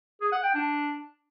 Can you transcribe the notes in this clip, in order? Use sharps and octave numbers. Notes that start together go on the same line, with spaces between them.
G#4
F#5
G5
D4